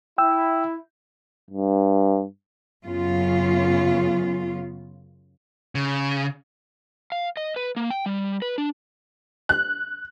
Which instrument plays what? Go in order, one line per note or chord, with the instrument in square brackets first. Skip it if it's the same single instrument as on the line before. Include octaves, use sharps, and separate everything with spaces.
[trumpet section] E4 [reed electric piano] G5 E6
[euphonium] G2
[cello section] F#2 C#3 B3 F4
[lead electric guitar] C#3
[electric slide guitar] F5
D#5
B4
A#3
G5
G3
B4
D4
[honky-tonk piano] F#6